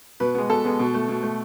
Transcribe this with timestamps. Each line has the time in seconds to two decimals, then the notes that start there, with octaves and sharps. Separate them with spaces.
0.20 B2 B4
0.35 G#3 B3
0.49 B2 A4
0.65 G#3 B3
0.79 B2
0.94 A3
1.08 B2
1.23 A3